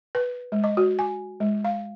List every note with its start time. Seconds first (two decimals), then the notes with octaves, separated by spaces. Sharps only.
0.15 B4
0.52 G#3
0.64 D#5
0.77 F#4
0.99 G#5
1.40 G#3
1.65 F5